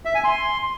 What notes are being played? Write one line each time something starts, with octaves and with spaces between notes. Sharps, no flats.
E5
G#5
C6